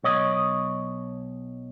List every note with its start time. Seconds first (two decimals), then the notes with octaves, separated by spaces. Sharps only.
0.04 B1 C#5 D#5